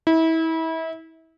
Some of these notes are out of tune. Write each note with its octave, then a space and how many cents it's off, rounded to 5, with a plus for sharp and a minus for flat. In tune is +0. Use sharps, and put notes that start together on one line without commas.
E4 -30